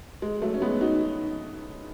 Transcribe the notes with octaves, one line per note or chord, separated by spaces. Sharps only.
G#3
F#3 A3
C#4
G#3 B3
D#4 F#4